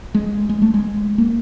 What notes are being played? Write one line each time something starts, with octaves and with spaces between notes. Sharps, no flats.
G#3
G#3
A3
G#3
A#3